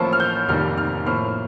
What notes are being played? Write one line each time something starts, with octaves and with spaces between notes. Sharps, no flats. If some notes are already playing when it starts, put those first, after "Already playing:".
Already playing: A1 A2 F3 A#3 A5
F6
G6
F1 F2 D#3 G3 A#3 F6
F6
A2 F3 A#3 F6